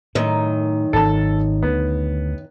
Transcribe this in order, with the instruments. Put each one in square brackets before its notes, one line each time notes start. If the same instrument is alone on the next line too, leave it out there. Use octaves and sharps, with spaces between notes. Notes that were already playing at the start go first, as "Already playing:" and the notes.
[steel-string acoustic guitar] F#2 D#3 [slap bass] A2
[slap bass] G#1 [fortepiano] A4 A5
[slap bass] D2 [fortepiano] B3